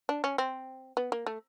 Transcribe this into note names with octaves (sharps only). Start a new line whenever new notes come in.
D4
C#4
C4
B3
A#3
A3